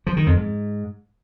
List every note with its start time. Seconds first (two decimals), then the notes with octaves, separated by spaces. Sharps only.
0.07 F3
0.17 D#3
0.27 F2
0.37 G#2